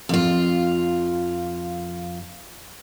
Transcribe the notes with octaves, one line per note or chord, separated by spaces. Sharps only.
F2 F4